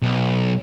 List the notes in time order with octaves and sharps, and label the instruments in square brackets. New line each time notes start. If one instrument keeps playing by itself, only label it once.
[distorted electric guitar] B1